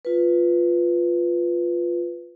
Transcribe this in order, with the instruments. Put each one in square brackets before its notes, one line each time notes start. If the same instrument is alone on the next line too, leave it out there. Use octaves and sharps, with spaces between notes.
[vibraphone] F4 B4